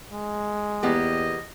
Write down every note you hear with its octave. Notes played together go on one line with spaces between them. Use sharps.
G#3
E2 A#3 B3 G4 D#5